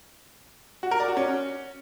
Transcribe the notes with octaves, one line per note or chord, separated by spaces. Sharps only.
F#4
A#4
D5
F#4
C#4